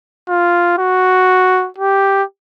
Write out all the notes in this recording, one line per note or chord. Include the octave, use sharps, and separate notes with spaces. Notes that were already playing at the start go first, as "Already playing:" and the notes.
F4
F#4
G4